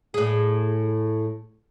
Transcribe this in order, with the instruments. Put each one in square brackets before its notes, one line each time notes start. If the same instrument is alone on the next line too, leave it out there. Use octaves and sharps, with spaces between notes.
[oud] A2 G#4